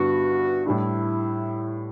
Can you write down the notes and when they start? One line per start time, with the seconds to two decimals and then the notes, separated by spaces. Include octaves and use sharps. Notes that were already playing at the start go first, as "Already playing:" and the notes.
Already playing: G2 D3 G3 B3 E4 F#4
0.66 A2 G3 D4 E4